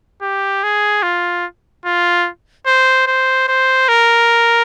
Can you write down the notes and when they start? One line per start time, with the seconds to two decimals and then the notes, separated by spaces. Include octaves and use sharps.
0.22 G4
0.63 G#4
1.03 F4
1.85 F4
2.66 C5
3.07 C5
3.48 C5
3.89 A#4